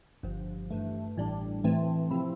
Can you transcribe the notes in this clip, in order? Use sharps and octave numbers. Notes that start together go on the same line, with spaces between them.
G1 G2 F3
G2 E3 A3
A1 A2 G3 D4
A2 E3 A3 C4
C3 F3 C4 E4